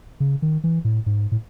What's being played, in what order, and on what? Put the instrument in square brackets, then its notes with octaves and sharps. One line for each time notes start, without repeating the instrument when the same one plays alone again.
[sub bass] C#3
D#3
E3
A2
G#2
A2